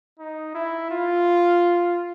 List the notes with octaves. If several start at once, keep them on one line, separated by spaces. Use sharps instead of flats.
D#4
E4
F4